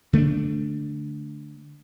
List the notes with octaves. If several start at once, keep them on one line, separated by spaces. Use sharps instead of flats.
D3 A3 B3 D4